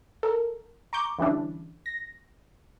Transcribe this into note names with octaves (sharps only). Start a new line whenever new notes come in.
A4 A#4
A#5 C#6 D6 G6
D3 E3 G3 C#4 D4 E4
A#6